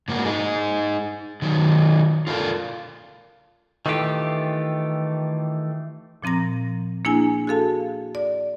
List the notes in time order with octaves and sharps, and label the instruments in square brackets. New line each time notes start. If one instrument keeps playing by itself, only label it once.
[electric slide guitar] G#2 A#3 F#4 A#4
D#4 G#4
D#3 F#3
F4 A4 A#4 F5
[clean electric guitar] D#3 E3 A3 F4 G4
[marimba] A#2 F3 C4 A#5 A#6
A#3 D4 E4 G#4 G#5
F#4 G#4 A4 F5 A5
D5